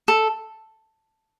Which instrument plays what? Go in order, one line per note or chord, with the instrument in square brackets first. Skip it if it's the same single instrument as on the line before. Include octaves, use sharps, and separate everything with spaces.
[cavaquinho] A4